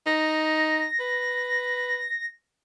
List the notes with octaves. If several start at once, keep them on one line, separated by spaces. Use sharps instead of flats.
D#4 A#6
B4